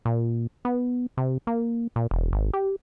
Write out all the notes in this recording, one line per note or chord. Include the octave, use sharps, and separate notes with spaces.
A#2
B3
C3
A#3
A#2
E1
G#1
G4